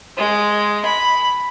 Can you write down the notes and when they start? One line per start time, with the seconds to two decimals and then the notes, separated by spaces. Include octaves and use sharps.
0.17 G#3
0.85 B5